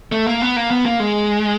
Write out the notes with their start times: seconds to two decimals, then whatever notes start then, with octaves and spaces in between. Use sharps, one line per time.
0.12 A3
0.27 A#3
0.42 B3
0.56 A#3
0.71 B3
0.86 A#3
1.00 G#3